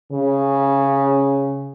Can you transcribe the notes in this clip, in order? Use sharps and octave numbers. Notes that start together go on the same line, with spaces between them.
C#3